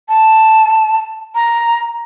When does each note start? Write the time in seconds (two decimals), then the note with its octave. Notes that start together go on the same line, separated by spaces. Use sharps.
0.09 A5
1.35 A#5